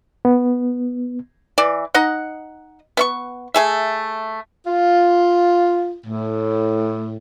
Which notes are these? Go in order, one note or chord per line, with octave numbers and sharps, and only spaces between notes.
B3
E3 D5
D#4 D#5 F#5
B3 E5 C#6
A3 G#4 E5
F4
A2